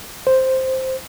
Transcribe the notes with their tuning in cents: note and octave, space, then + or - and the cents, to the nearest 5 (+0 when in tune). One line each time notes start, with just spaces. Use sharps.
C5 +0